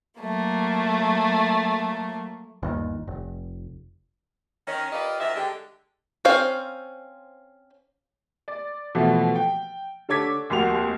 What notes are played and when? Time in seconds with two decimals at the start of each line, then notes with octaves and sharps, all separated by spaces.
0.20 F#3 A3 A#3
2.63 G1 D#2
3.08 F1
4.67 D#3 C#4
4.93 F4 G4 A#4 B4 D5 D#5
5.19 F#2 D#3 F3 D5 E5
5.36 D3 G#3 G4
6.25 C4 C#4 C5 F5
8.48 D5
8.95 B2 E3 F3 A3 B3
9.35 G5
10.09 D3 A4 C#5 D6 G#6 B6
10.50 F1 D#2 A#3 F#4 C6 F7